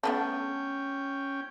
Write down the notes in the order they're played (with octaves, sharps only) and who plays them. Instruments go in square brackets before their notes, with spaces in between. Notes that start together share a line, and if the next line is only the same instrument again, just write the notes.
[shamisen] A3 B3 D4 [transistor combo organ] C#4 G5